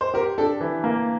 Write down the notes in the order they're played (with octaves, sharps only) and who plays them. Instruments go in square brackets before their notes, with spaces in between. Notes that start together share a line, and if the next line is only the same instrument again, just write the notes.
[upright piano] C5
[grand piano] G4 [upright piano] A#4
[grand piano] D4 [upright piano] A4
[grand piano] E3
A#3